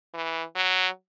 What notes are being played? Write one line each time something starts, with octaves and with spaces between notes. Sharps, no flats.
E3
F#3